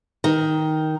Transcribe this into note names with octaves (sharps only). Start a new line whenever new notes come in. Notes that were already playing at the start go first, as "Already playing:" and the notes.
D#3